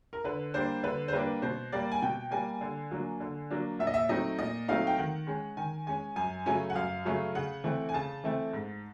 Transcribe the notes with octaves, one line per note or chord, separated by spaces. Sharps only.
A#4
D3 B4
G3 A#3 D4 C5
D3 B4
C5
G3 A#3 D4 B4
B2 C5
G3 A#3 D5
G#5
B2 G5
G3 A#3 G#5
D3
F#3 A#3 D4
D3
F#3 A#3 D4
A#2 E5
D#5
E5
F#3 A3 C4 D#4 D#5
A#2 D#5
F#3 A3 C4 D#4 F5
G5
D#3 F#5
G#3 C#4
D#3 G#5
G#3 C#4 G#5
F#2 G#5
C#3 F#3 A3 C#4 G#5
F#5
F#2 F5
C#3 F#3 A3 C#4
C#3 F#5
E3 A3 C4
G#5
C#3 A5
E3 A3 C4
G#2